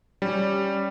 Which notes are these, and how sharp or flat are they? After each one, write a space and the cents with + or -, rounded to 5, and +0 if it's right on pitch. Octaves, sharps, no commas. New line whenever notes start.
G3 +0 C#4 +0